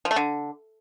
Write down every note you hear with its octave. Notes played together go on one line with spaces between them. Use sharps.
F3
A3
D3